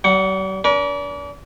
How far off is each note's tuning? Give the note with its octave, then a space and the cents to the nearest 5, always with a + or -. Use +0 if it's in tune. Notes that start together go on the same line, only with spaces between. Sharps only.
G3 -45 F#5 +0
D4 -35 A#4 +45